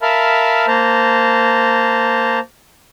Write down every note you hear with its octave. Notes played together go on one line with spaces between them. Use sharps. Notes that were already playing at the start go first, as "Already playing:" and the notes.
A#4 E5 F5 A5 B5 F6
A#3 C5 A5 A#5